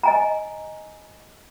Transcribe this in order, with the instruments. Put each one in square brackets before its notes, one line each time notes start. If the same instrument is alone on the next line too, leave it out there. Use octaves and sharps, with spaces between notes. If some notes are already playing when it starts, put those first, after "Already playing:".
[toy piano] D#5 G#5 A#5